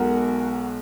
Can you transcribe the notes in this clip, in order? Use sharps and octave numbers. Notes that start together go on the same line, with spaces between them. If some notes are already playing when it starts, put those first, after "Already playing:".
Already playing: B1 B2 G#3 F#4 A#4